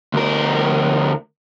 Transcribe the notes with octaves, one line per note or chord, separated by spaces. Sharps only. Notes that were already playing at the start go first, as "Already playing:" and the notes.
D2 A#4